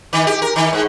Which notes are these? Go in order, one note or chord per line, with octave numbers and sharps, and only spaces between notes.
D#3
G4
A#4
D#3
G#2